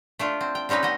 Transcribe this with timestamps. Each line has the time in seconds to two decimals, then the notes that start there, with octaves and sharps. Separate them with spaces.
0.19 A3 D4 F4
0.41 C4
0.55 G5
0.69 G3 C4 C#4 D#4 B4
0.83 B3 C#4 D#5